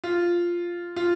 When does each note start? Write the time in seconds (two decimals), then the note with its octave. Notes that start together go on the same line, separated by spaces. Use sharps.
0.04 F4
0.96 F4